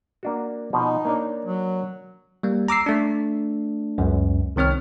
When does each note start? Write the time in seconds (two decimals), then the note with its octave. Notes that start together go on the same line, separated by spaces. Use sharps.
0.23 A#3 D4 F#4
0.73 B2 F3 D#4
1.05 A#3 D4 C#5
1.45 F#3
2.43 G3 A#3
2.68 A#5 D6 E6 C7
2.86 A3 D4
3.98 C#2 F#2
4.56 C2 D#3 C4 C#5 F6